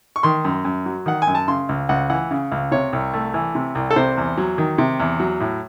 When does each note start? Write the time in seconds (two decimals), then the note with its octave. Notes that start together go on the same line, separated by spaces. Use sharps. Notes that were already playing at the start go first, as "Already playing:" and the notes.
0.16 C#6
0.23 D#3 C6
0.45 F#2
0.65 F#2
0.86 F#3
1.06 D#3 F#5
1.22 G#5
1.27 F#2
1.35 A5
1.48 C#3 C6
1.69 C#2
1.89 C#2 F#5
2.10 E3 F#5
2.31 C#3
2.52 C#2
2.72 C3 C#5
2.93 C2
3.14 A3
3.34 E3
3.55 C3
3.75 C2
3.91 A4
3.96 C3 C5
4.17 E2
4.38 F#3
4.58 D#3
4.78 C3
5.00 E2
5.20 F#3
5.40 A2